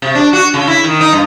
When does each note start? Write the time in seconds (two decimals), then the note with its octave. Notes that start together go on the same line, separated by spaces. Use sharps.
0.02 C3
0.15 D4
0.33 F#4
0.54 C#3
0.67 E4
0.84 D#3
1.01 D#4
1.13 G2